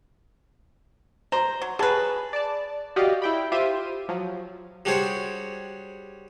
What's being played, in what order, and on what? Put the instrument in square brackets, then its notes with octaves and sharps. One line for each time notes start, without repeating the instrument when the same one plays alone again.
[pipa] C5 [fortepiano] A#5
[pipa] F#3
[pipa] F#3 B4 [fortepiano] G#4 A5
[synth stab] D5 A5
F#4 G4 D5 D#5 F5
E4 G5 B5
F4 G4 C5 E5 D#7
F3 F#3
[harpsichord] G3 D4 F#4 G#4 C5 C#5